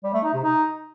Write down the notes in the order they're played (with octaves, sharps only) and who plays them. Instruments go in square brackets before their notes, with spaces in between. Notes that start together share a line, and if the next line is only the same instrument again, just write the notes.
[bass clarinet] G3
A3
D#4
C3
D#4